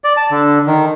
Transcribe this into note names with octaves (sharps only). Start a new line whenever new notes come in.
D5
A5
D3
D#3